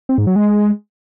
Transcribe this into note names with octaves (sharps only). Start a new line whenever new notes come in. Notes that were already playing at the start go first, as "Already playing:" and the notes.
C4
G#2
F#3
G#3